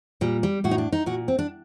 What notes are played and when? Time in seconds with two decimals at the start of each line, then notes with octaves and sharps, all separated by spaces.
0.21 A#2 G3
0.43 G3
0.64 A2 F#4
0.71 D#4
0.78 D4
0.92 D#4
1.06 A#2 F#4
1.28 C4
1.39 D4